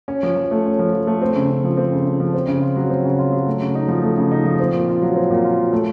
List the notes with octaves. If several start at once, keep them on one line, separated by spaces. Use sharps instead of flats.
C#4
F3
F3
A3
C#4
F3
F3
A3
C4
C#3
C#3
F3
C4
C#3
C#3
F3
C4
C#3
F4
F#3
C4
C#3
F4
F#3
A3
C#3
D#4
F3
A3
C#3
D#4
F3
C4
A#2
F4
F#3
C4
A#2
F4
F#3
A3